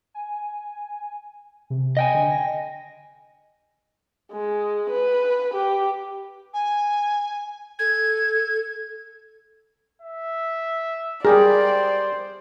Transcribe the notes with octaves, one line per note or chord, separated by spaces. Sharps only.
G#5
C3
D#5 G5 G#5
D3
A#6
G#3
B4
G4
G#5
A4 G#6
E5
G3 G4 G#4 A#4 C5 D5